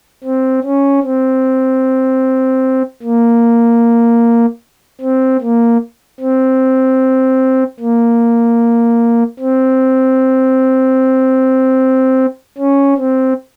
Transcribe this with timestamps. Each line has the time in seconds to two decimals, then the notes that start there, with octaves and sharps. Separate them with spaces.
0.24 C4
0.64 C#4
1.04 C4
3.03 A#3
5.01 C4
5.42 A#3
6.21 C4
7.80 A#3
9.40 C4
12.58 C#4
12.98 C4